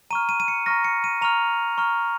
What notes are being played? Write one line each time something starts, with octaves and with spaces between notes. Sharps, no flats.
A#5 C#6 F6 D#7
D#7
D#7
C#7
A#5 C#6 F6 A#6
C#7
D#7
A#5 C#6 F6 F7
A#5 C#6 F6